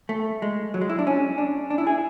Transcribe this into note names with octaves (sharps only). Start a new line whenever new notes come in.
A3
G#3
F#3
G#3
E4
D4
C#4
D4
D4
E4
G#4